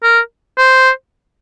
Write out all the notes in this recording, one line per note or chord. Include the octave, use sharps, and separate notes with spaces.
A#4
C5